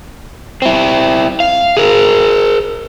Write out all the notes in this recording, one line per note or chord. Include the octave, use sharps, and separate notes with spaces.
C4 E4
F5
G#4 A#4